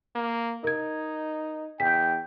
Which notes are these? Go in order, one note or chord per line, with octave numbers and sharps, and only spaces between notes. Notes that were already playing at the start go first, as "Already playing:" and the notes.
A#3
D#4 A#4 G#6
E2 G5 B6